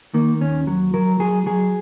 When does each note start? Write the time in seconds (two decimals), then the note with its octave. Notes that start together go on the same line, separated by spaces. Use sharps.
0.14 D#3 A#3
0.41 D#2 C#4
0.67 F#3
0.94 F#3 A#4
1.20 F#3 G#4
1.46 F#3 G#4